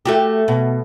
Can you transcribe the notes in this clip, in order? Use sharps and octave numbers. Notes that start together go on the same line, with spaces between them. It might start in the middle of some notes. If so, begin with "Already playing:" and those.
A3 F#4 G4
B2